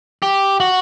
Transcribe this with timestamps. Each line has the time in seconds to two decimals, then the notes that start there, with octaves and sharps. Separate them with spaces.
0.22 G4
0.60 F#4